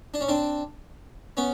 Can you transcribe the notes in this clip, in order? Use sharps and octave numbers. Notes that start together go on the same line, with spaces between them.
D4
C#4
C4 D4
B3 C#4